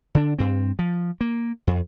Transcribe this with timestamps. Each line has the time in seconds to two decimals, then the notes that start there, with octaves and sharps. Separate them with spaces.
0.15 D3 D4
0.39 G2 C4
0.79 F3
1.21 A#3
1.67 F2